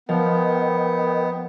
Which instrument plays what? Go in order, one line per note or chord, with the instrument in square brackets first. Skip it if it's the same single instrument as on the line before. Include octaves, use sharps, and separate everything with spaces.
[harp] F3 [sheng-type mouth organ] B3 [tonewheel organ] A#4 D#5 G5